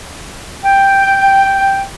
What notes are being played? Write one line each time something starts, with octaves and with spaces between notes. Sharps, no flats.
G5